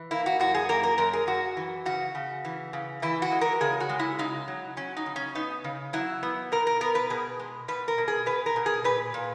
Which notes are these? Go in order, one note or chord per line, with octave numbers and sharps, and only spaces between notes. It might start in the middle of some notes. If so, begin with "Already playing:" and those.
Already playing: E3
A#3 E4
F#4
F#2 F#4
G#4
A#3 A#4
A#4
F#2 A#4
G#4
F#2 F#4
E3
C#3 F#4
C#3
E3
C#3
E3 E4
F#4
G#3
A#4
C#3 G#4
F#4
G#3
E4
C#3 D#4
F#3
F#3 C#4
D#4
C#3
C#4
B3 D#4
C#3
F#3 E4
B3
B2 A#4
A#4
B3 A#4
B4
B2 G#4
G#3
B2 B4
A#4
B2
G#4
B2 B4
A#4
B2
G#4
A#2 B4
A#2